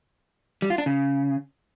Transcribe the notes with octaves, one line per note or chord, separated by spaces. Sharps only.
G3
F4
D4
C#3